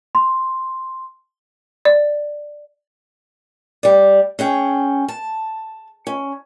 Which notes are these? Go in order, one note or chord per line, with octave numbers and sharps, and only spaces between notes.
C6
D5
G3 D5
C#4 G#4 G5
A5
C#4